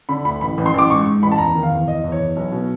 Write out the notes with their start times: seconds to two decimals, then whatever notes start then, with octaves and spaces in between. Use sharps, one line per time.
0.09 D3 B5
0.25 D2 B5
0.41 A1 B5
0.58 A1
0.66 C6
0.74 A1 D6
0.90 G#2 C#6
1.06 G#2
1.22 A1 B5
1.31 A5
1.38 E2 A#5
1.55 D#3
1.63 F5
1.71 E2
1.87 E2 D#5
2.04 E2
2.12 C#5
2.20 E2
2.36 B1
2.52 B2